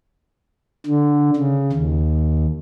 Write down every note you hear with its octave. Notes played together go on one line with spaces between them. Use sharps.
D3
C#3
D#2